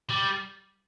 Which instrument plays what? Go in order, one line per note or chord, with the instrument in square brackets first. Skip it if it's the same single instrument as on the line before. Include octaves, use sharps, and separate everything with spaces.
[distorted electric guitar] G3